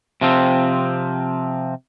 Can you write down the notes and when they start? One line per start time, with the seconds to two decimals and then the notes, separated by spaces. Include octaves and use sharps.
0.21 C3 F3 C4